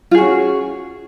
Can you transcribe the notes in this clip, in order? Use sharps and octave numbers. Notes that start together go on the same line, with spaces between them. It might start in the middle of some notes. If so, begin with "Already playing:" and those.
C#4 F4 F#4 G#4